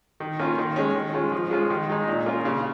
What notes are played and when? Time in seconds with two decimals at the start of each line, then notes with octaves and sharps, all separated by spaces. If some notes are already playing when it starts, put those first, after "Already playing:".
0.20 D#3
0.39 A#3 C#4 F4
0.58 D#3
0.76 G#3 C#4
0.95 D#3
1.14 G#3 C#4 F4
1.32 F3
1.51 G#3 C#4 F4
1.70 D#3
1.90 G#3 D#4
2.08 A#2
2.26 A#3 C#4 F4
2.45 C#3